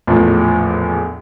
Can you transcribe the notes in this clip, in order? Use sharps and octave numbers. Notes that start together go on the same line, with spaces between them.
A#1 E2 A2 F3